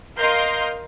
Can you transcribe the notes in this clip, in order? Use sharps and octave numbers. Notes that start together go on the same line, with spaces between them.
A#4 D#5 F5 C6 F6 G6